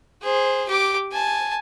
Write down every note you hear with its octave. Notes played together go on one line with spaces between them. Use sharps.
G#4 C5
G4 D6
G#5 A5